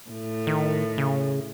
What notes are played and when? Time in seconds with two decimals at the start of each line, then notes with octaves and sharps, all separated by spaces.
0.11 A2
0.47 D#3
0.98 C#3